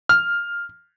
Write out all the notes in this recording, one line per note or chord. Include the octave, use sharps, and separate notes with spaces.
F6